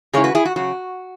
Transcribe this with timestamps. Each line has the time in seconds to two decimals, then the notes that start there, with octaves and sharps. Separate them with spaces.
0.13 C#3 G#3 C#4 E4 G#4 C#5
0.24 F#4 B4
0.35 E4 G#4
0.45 F#4
0.56 C#3 F#3 F#4